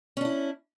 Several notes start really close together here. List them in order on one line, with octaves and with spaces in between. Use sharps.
C#4 D4 E4